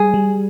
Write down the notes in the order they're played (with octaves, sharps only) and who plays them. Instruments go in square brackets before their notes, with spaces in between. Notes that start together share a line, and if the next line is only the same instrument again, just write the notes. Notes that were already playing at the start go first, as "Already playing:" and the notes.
Already playing: [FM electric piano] G3 [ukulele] G#4
[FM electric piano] G3